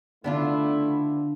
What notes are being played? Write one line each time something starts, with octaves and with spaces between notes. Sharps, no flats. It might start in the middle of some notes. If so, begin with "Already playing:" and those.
D3 A3 B3 D4 E4 F4